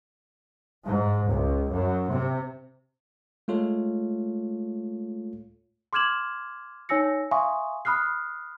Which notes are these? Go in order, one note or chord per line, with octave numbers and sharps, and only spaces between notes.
G#2
C#2
F#2
C3
G#3 A3 F4 A4 C#5
C6 D6 F6 G#6 E7 F#7
D#4 C#5 G#5 E6 A#6 C#7
E5 F5 G#5 C6 C#6 D#6
B5 D#6 F6 F#6 C7